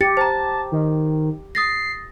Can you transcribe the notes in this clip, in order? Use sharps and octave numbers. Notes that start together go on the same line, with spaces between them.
G4 A6 C#7
C5 A5 A#5
D#3
D#6 A6 A#6 C7